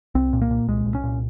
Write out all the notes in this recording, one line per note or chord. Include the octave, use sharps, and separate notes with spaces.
C2 C4
A#2
A#3
A#2
C2 G#3
C2
C#4
A#2